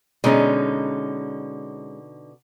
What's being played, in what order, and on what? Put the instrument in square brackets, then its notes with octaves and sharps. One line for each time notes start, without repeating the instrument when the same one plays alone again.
[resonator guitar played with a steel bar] B2 D3 D#4 [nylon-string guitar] G#3 C#4